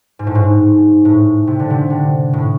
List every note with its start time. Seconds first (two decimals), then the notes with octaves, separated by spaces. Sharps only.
0.19 G#2
0.27 A2
0.35 G#2
1.05 A2
1.47 C3
1.59 D3
1.70 C3
1.90 D3
2.33 A2